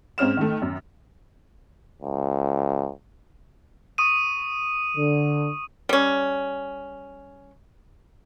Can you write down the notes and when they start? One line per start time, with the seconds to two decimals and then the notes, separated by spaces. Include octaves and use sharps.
0.18 G#2 C4 C#4 F6 E7
0.37 D#3 A3
0.62 F#2
2.02 C#2
3.98 C#6 D#6 D#7
4.96 D3
5.89 G3 C#4